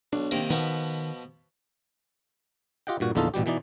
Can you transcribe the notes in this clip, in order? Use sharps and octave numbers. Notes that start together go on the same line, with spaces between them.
B1 D4
C3 D#3 A#3
B2 D#3 F3 B3
F4 G4 D#5 F#5 G5
G2 A#2 F#4
A#1 E2 D3 D#4 F4 A4
A1 B2 G3 G4
B2 E3 D#4 D5